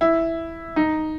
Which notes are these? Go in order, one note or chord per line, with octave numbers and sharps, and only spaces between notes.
E4
D#4